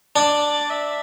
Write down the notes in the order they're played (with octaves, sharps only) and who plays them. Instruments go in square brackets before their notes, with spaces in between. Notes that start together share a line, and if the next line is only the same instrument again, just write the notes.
[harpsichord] D4 [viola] D5
[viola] E5